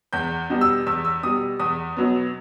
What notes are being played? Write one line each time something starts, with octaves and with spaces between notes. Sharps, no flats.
E2 G6
B2 G3
E6
E2 E6
E6
B2 G3 D#6
E2 D#6
B2 F#3 B3